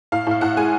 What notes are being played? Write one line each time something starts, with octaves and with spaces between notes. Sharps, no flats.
A2 F5
A2 F5
A2 F#5
G#3 G#5